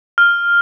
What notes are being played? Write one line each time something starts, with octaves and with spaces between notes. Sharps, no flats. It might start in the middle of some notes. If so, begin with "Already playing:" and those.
F6